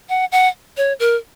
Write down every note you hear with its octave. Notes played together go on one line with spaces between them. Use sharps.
F#5
F#5
C#5
A#4